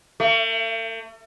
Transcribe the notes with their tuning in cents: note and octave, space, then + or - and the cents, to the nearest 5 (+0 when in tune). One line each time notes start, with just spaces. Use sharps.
A3 +45